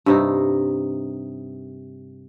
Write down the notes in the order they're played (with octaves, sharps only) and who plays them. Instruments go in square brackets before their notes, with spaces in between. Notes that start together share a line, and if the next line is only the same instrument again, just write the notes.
[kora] G2 C3 D#4